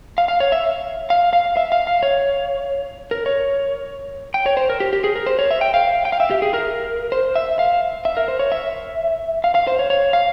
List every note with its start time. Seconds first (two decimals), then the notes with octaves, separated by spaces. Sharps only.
0.18 F5
0.28 F5
0.40 C#5
0.52 E5
1.10 F5
1.33 F5
1.57 E5
1.72 F5
1.87 F5
2.03 C#5
3.11 A#4
3.26 C#5
4.34 G5
4.46 C#5
4.57 C5
4.70 A#4
4.80 G4
4.93 G4
5.04 G#4
5.15 A#4
5.27 C5
5.39 C#5
5.51 E5
5.61 G5
5.74 F5
6.05 G5
6.12 F5
6.20 E5
6.31 G4
6.42 G#4
6.54 A#4
7.12 C5
7.35 E5
7.59 F5
8.05 E5
8.17 A#4
8.28 C5
8.39 C#5
8.52 E5
9.44 F5
9.55 F5
9.67 C5
9.79 C#5
9.90 C#5
10.13 F5